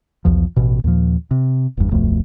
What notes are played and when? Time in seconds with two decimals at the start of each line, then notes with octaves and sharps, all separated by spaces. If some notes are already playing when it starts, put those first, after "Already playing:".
0.25 B1 E2 F3
0.56 A1 B2
0.84 D#2 A#2 F3
1.31 C3
1.77 F#1 E2 G2
1.91 D1 B1 F2 A3